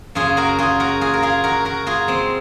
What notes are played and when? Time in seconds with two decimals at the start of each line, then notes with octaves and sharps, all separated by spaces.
0.15 F#2 C#3 F4 G#4
0.37 F#4 A#4
0.59 F4 G#4
0.80 F#4 A#4
1.01 F4 G#4
1.13 A#4
1.23 F4 G#4
1.44 F#4 A#4
1.65 F#4 A#4
1.87 F4 G#4
2.08 G#3 C4